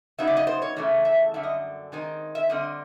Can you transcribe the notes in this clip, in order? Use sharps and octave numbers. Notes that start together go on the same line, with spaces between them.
C#3 F#3 B3 D#4 E5
D5
D#5
C5
C#5
E2 C#3 E3 A3
E5
F#2 D3 G3 E5
D#5
D#3 G#3 C4 D#4
E5
D3 G3 C4 D#5